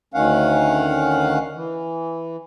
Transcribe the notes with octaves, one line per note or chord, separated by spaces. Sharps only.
D2 D#3 C#4 F5 F#5
E3